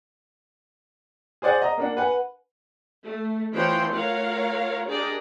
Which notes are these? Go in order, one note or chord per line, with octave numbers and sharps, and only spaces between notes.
G#4 C5 D5 F#5 G#5
D#5 A#5
A#3 D4 F#5
B4 F#5 G#5
A3
E3 F3 C#5 G5 C6
A3 F4 A#4 C#5 F5 F#5
D4 G4 G#4 A#4 D5 D#5